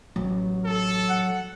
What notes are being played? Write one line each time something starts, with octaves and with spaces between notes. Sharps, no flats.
A1 F#3
A4
F#5